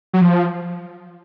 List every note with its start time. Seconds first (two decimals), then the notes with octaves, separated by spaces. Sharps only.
0.13 F#3
0.21 F3